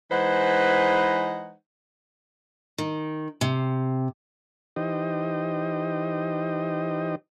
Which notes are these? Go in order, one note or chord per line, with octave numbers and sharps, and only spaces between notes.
E3 G#3 D#4 B4 C5 F#5
D#3
C3
E3 D#4 G4 C5 D#5